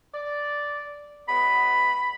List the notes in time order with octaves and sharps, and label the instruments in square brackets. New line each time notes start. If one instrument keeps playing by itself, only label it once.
[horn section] D5
[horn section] F#3 G#3 B3 [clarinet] B5